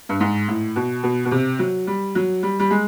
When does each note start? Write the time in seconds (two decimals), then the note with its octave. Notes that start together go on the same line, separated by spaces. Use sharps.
0.09 G2
0.20 G#2
0.48 A2
0.76 B2
1.03 B2
1.25 B2
1.31 C3
1.59 F#3
1.87 G3
2.15 F#3
2.43 G3
2.60 G3
2.71 G#3